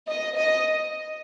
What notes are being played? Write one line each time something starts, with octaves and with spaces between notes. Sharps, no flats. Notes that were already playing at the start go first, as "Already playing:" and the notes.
D#5
D#5